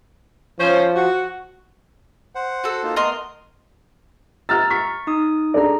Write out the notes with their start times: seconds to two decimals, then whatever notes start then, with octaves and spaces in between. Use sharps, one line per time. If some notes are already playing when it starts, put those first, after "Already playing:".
0.59 F3 C#4 C5
0.96 F#4
2.35 C5 F#5
2.64 F#4 A4
2.83 A#3 D#4 F4
2.96 A3 B3 A#4 D#5 C6
4.49 A#5 E6 F6 A6
4.70 C#6 B6
5.07 D#4 D#6
5.54 D4 G#4 A4 D5 A#5